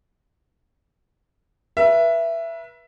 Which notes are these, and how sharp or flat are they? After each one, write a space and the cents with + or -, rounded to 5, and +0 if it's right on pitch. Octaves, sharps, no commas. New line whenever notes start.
B4 -35 E5 +15